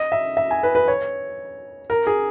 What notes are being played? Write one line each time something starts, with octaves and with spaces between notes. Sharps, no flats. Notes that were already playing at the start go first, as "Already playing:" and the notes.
Already playing: D#5
E5
E5
G#5
B4
B4
C#5
A#4
G#4